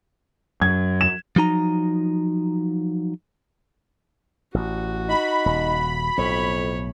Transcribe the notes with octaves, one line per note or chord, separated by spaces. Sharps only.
F#2 G#6
E7
F3 F#3 D#4 A#5
A1 F#4
D#4 B5
D#1
B1 F2 A2 C#5